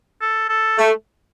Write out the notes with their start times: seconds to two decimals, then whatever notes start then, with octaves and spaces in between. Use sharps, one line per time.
0.21 A4
0.49 A4
0.78 A3